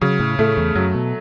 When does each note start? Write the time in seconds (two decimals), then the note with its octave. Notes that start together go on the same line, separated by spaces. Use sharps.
0.01 C#3 F#3
0.20 A2
0.39 A2 A3
0.57 E2
0.75 F#2 F#3
0.95 B2